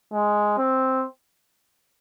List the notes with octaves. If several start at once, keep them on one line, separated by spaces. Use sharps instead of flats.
G#3
C4